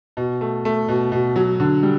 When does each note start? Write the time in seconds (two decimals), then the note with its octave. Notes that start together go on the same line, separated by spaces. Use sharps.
0.17 B2
0.41 A3
0.65 A3
0.88 B2
1.12 B2
1.36 F#3
1.60 D3
1.83 G3